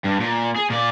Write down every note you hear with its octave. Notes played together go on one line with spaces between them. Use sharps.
G2
A#2
G#4
A#2 D5